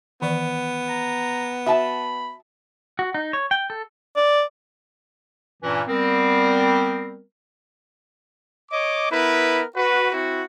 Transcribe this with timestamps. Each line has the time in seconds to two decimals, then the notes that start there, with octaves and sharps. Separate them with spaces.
0.22 D#3 E3 B3 D5
0.89 A#5
1.66 F#4 E5 A5 B5
2.99 F#4
3.14 D#4
3.33 C#5
3.51 G5
3.70 A4
4.16 D5
5.63 G2 A#2 E3 C#4
5.88 G3 B3 C4 A#4
8.71 C#5 D#5 D6
9.10 B3 E4 A#4 B4
9.74 F#4 B4
10.11 C4 E4 F#4